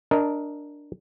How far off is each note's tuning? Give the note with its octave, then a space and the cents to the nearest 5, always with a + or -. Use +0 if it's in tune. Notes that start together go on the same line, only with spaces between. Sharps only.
D4 +0 A#4 +0 D#5 +20